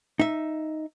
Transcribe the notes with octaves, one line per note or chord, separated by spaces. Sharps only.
D#4 E5